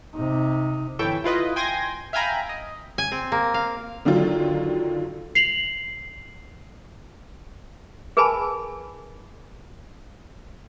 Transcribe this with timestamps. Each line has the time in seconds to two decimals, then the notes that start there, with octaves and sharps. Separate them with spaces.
0.16 C3 D#4
0.99 G1 E3 A4 C#5 E5 G5
1.24 E4 F4 B4 D#5
1.56 G5 G#5 C6 G#6 A#6
2.13 E5 F5 G5 G#5 A#5 B5
2.49 D#5
2.98 G#5
3.12 C4
3.32 A#3
3.54 F5
4.05 D3 D#3 F#3 F4
5.35 C7 F7 F#7
8.17 G#4 A#4 B4 G#5 A5 B5